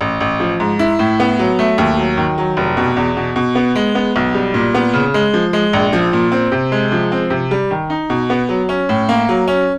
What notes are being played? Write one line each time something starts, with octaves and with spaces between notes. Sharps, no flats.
A1
A1
F3
G#2
E4
A2
B3
F#3
A3
D#2
F#3
D#3
F#3
F1
B2
E2
B2
B2
B3
G#3
B3
B1
G3
A#2
B3
C#3
G#3
F3
G#3
A#1
F3
A#2
C4
C3
G#3
F3
C4
C3
G3
D#3
D#4
B2
B3
F#3
C#4
A2
A#3
F#3
C#4